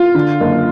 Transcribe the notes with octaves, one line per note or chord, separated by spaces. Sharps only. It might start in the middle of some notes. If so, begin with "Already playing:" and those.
Already playing: F4
D3
F#1